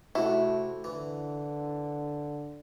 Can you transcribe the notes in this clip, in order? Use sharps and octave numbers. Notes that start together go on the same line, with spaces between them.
C3 A3 E4 F#4
D3 E3